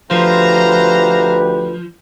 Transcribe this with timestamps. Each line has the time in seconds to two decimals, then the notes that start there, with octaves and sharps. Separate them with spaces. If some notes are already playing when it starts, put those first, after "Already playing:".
0.11 D2 F3 G4 B4 C5 F5 A#5